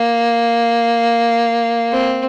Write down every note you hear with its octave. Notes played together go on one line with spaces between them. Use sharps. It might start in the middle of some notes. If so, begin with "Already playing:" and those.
Already playing: A#3
C4